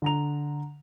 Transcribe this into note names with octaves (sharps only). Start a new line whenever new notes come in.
D3 A#5 F7